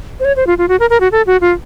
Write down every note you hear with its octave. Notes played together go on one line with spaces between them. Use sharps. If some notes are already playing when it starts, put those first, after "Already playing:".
C5
C#5
C5
F4
F4
F#4
A#4
A#4
F#4
A4
F#4
F4